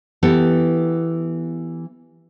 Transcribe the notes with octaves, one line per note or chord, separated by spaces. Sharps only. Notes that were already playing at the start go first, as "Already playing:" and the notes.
E3 B3 G4 A4